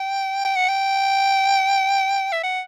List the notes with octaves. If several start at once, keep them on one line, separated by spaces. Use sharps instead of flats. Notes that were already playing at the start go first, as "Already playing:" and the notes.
Already playing: G5
G5
F#5
G5
E5
F#5